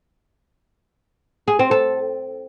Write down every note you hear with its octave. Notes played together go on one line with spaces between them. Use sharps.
G#4
C4
A4